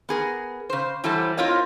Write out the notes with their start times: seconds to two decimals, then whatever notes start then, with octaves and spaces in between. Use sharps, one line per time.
0.09 B3 G#4 A#4
0.70 C#3 C5
1.04 E3 F#3 G3 E4 A4 C5
1.37 C4 E4 F4 A#4 C#5 D#5